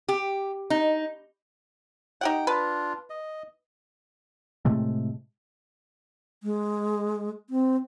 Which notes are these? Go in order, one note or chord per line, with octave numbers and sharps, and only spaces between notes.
G4
D#4
D#4 G4 F#5 G5
D4 F4 B4
D#5
A2 C3 G#3 A3
G#3
C4